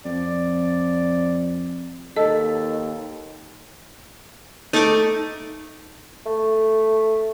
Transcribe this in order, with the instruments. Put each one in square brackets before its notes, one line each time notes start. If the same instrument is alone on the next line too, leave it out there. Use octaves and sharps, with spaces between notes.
[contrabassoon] F2 [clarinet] D5
[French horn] D#2 [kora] A4 [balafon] D#5
[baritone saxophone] A3 [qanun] D#4 D6
[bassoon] A3